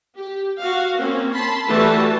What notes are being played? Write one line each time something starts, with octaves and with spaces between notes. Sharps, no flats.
G4
F#4 F5
A#3 C4 C#4
A5 B5 C6
E3 G3 A3 F#4 G4 A5